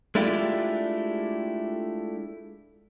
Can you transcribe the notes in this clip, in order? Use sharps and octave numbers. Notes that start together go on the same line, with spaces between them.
G#3 A3 D4 E4 F4 G4